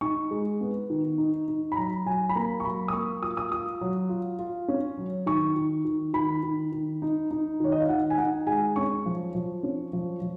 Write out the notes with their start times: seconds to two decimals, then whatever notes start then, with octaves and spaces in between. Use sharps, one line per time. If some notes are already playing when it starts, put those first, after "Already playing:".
0.01 D#4 C#6
0.31 G#3
0.61 B3
0.90 D#3
1.18 D#4
1.48 D#4
1.72 B5
1.76 F#3 A#5
2.06 F#3 G#5
2.29 B5
2.35 A#3 A#5
2.60 C#6
2.64 F#3 B5
2.88 D#6
2.93 A#3 C#6
3.22 F4 D#6
3.37 D#6
3.51 F4 D#6
3.81 F#3
4.09 F4
4.39 F4
4.68 C#4
4.98 F#3
5.26 D#3 C#6
5.56 D#3
5.85 D#3
6.13 D#3 B5
6.43 D#3
6.72 D#3
7.02 D#4
7.31 D#4
7.60 D#3 C#5
7.72 D#5
7.81 F5
7.89 D#3 F#5
8.10 G#5
8.17 D#4 F#5
8.47 G#3 G#5
8.76 C#4 C#6
9.06 F3
9.35 F3
9.63 C#4
9.93 F3
10.22 F3